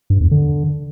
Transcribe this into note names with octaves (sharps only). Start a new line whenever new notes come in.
G2
E2
D3